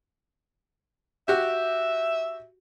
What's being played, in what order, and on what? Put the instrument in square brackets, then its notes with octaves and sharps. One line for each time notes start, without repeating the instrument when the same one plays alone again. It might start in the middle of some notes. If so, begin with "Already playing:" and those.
[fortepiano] F#4 G4 [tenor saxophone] E5